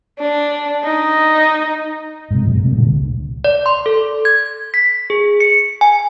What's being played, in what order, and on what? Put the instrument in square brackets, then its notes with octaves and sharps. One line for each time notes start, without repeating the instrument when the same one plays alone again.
[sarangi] D4
D#4
[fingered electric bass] G#2 C3
F#2 A#2 F3
C3 A3
A#2 D3 G3
C#2
[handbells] D5
C6
A4
G#6
B6
G#4
C#7
G#5